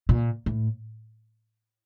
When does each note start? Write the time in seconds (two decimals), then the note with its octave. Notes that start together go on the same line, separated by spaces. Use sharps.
0.09 A#2
0.46 A2